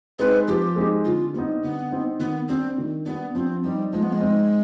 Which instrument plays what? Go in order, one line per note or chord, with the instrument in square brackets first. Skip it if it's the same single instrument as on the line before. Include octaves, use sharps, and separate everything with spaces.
[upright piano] G#3 C4 D#4 [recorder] B4
[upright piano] F3 [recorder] G4
[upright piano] G#3 C4 D#4
[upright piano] D3 [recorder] F4
[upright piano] G3 C4 D#4 [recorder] B3
[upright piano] D3 [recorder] B3
[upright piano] G3 C4 D#4
[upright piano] D#3 [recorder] B3
[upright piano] G3 D4 [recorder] C4
[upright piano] D#3
[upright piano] G3 D4 [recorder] B3
[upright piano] F3 [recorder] C4
[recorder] G3 [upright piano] C4 D#4
[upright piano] F3 [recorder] G#3
[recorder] B3
G#3
[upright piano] C4 D#4